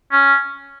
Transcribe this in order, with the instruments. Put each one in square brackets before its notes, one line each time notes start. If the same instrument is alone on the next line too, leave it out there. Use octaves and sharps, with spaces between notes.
[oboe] C#4